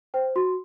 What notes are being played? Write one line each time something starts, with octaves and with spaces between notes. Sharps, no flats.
C5 G5
F#4 C6